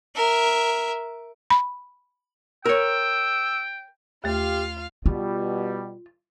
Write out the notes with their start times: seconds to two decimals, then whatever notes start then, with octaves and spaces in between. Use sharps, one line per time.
0.15 A#4 E5
1.50 B5
2.66 A#4 C#5 G5 E6
4.24 D#2 A3 F4 G4 F5
5.06 B2 G3 F4